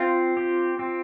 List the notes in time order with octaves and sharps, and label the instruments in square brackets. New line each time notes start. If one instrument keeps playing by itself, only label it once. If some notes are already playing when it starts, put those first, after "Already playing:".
Already playing: [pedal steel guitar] C4 [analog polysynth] F4
[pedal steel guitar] G4
C4